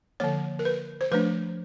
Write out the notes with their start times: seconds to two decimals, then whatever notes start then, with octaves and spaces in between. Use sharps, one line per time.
0.20 D3 F3 A#3 C#5
0.59 A#4
0.65 B4
1.01 C5
1.11 F3 A3 D4 B4